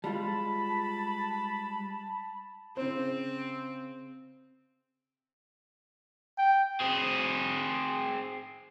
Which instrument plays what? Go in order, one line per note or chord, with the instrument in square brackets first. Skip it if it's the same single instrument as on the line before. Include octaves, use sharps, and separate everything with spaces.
[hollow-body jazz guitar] G3 G#3 F4 [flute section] A5 B5
[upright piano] C#3 C5 [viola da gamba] C4
[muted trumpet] G5
[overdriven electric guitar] C4 G#4